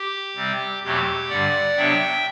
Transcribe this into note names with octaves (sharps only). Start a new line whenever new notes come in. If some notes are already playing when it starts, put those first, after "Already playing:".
Already playing: G4
C3 G3 C4
E2 B2 F#3 A3 C4 G4
G2 D3 G3 D5 F#5
C3 F#3 B3 D4 E5 G5